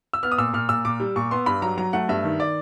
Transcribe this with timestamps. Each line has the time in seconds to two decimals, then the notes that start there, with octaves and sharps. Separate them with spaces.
0.13 E6
0.23 B3 F6
0.32 D#6
0.38 A#2 E6
0.53 A#2 F6
0.69 A#2 E6
0.85 A#2 D6
1.00 G3
1.16 A#2 C#6
1.31 B3 C6
1.46 G2 B5
1.62 F#3 A#5
1.77 F#3 A#5
1.93 A3 F#5
2.09 G2 E5
2.24 D#3
2.40 D5